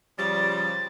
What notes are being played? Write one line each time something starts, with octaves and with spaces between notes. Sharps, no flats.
C#3 F3 G3 A6